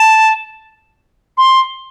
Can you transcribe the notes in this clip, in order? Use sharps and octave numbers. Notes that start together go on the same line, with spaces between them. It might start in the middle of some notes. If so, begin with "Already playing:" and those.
Already playing: A5
C6